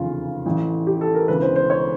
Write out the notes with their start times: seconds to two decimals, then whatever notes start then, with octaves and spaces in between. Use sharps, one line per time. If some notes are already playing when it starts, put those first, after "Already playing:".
Already playing: F1 E2 C#3 F4
0.46 A1 A2 E3
0.87 G4
1.01 A4
1.15 A#4
1.28 E1 D2 C#3 E3 B4
1.42 C5
1.56 C5
1.70 C#5